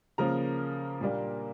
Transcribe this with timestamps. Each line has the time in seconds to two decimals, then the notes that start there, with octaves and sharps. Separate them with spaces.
0.18 C#3 F3 A#3 A#4 A#5
1.00 A#2 G3 A#3 D4